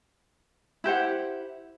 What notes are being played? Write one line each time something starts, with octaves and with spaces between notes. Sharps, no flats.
E4 G4 C5 F#5